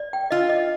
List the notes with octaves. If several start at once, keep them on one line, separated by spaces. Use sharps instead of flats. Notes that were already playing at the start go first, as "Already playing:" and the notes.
Already playing: D5
G5
F4 D#5
D#5